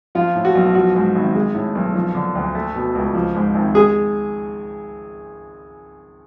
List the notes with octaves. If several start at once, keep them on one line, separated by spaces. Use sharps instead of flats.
F3 F4
A2
F#4
B1
F3 F#4
G#2
G#1
G#3
A2
B1
F3
D3
D2
A3
B2
C#2
F3
G#2
G#1
G#3 G#4